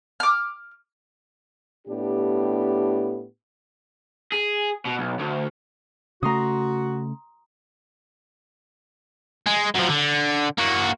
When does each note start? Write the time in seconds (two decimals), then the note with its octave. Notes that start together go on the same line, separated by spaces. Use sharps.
0.20 D6 F6
1.88 A2 B3 D4 G4
4.32 G#4
4.85 B2
4.99 B1
5.19 D2
6.23 C#3 A3 F#4 A#5 C6 D#6
9.46 G#3
9.75 F#2 F3
9.89 D3
10.58 A#3 F#4